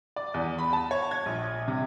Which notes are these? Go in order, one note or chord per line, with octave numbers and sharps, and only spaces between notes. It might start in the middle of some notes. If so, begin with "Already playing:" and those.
D5
E2
B5
A5
C#5
G#6
A#1
C3